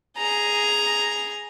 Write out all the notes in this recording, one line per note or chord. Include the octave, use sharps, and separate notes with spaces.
G#4 A#5